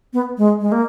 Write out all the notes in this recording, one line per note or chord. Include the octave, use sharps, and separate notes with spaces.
B3
G#3
G#3
A#3